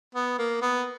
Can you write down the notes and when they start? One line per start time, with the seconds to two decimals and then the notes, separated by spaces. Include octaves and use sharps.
0.15 B3
0.39 A#3
0.62 B3